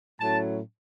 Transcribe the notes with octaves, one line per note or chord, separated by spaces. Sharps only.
A2 F#3 C#4 A5